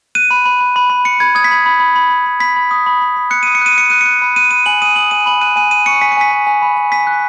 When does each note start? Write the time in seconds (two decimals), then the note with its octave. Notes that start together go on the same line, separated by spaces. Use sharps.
0.15 F#6 D#7
0.31 B5
0.45 B5
0.61 B5
0.76 B5
0.90 B5
1.05 B5 C#7
1.20 B5 G#6
1.35 D#6 G#6
1.44 B6
1.51 B5 G#6
1.66 B5
1.80 B5
1.96 B5
2.10 B5
2.26 B5
2.40 B5 B6
2.56 B5
2.71 D#6
2.86 B5
3.01 B5
3.17 B5
3.31 F#6 C#7
3.43 D#6 D#7
3.55 C#7
3.61 F#6 D#7
3.76 F#6 C#7
3.90 F#6 D#7
4.01 C#7
4.06 F#6
4.22 B5
4.36 F#6 D#7
4.51 B5 D#7
4.66 G#5 F#7
4.82 D#6 D#7
4.96 D#6 F#7
5.11 G#5 D#7
5.26 B5 F#7
5.41 F#6 D#7
5.56 G#5 D#7
5.71 G#5 D#7
5.86 C#6 C#7
6.01 G#5 B6
6.12 C#7
6.17 G#5 B6
6.31 G#5
6.47 G#5
6.62 B5
6.77 G#5
6.92 G#5 B6
7.07 F#6